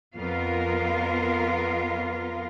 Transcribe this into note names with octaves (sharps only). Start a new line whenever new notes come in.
F2 B3 F4 A#4 F5